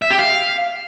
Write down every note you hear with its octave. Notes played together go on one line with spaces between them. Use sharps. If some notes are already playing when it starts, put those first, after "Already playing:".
E5
G4
F5